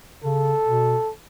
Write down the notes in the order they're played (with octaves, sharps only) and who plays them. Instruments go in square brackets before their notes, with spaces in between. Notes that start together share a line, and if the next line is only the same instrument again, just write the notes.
[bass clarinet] C#3 [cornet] A4
[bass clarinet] B2